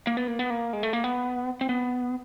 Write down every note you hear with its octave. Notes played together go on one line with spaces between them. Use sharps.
A#3
B3
A#3
B3
A#3
G#3
A3
A#3
B3
C4
B3